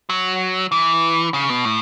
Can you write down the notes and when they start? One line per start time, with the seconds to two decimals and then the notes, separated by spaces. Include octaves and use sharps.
0.10 F#3
0.72 E3
1.34 C#3
1.50 B2
1.65 A2